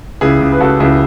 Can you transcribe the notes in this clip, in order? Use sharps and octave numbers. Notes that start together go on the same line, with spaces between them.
C#2 E4 G#4
C#2
B4
C#2 F#4 A4
C#2 E4 G#4